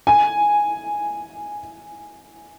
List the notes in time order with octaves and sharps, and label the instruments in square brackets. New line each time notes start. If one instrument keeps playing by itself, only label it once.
[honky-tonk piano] G#5